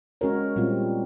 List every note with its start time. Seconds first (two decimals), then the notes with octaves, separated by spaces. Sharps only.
0.21 G#3 C#4 F#4 A#4 C#5
0.56 A#2 G3 C4 F4